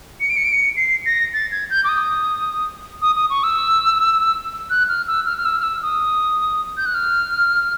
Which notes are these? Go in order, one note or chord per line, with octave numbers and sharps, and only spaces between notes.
C#7
D7
C#7
D7
C#7
C7
A#6
A6
G#6
G6
D6
D#6
D#6
D#6
C#6
E6
F#6
F6
E6
F6
F6
E6
F6
E6
D#6
G6
F#6
F6